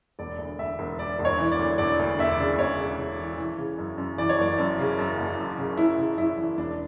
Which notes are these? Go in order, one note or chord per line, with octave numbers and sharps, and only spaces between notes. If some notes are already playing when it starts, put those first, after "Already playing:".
E1 D5
D2
D2 E5
E1
E1 D5
E1
C#5
E3
D5
D2
E1 D5
D2
E1 E5
D5
C#3
E1 C#5
C#3
C#3
E3
E3
C#3
F#2
F#2
E3 D5
C#5
F#1 D5
F#2
C#3
F#2
F#1
F#2
C#3
F#2 E4
C#3
F#2 E4
E3
E1 D4